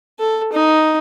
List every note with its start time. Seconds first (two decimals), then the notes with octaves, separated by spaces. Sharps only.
0.19 A4
0.53 D#4